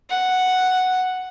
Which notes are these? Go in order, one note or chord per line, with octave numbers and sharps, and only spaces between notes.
F#5